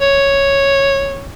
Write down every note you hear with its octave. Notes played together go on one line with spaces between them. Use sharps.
C#5